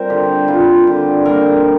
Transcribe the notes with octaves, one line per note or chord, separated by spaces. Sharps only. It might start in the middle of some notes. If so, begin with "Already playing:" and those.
Already playing: G3 C4 A#4 C5
D3 G4
G3 C4 F4
D3 G4
G3 A#3 A#4